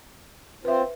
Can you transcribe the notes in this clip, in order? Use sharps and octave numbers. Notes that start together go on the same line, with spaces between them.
C4 F4 B4 C5 E5